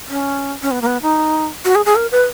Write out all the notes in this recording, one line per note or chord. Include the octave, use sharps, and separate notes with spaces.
C#4
C#4
B3
A#3
B3
D#4
F#4
G#4
G#4
A#4
B4